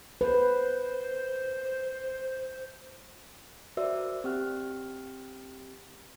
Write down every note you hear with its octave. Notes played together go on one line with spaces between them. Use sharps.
B4 C5
F#4 A#4 C5 D5 E5 E6
C4 G4 F#5 F6